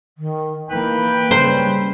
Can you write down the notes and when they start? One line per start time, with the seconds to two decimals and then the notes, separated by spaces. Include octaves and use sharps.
0.17 D#3
0.71 E3 A#3 D#4 B4 G5
1.31 C#3 G3 C5